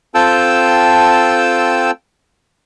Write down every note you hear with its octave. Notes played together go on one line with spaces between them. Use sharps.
C4 F4 A4 G5 A5 E6